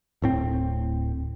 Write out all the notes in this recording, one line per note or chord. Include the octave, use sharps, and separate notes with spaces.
D1 A2 C4